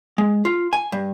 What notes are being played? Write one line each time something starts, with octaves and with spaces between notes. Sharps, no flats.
G#3
F4
G#5
G2